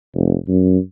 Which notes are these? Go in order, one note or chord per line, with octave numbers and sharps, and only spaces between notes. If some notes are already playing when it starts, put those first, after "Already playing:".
F1
F#2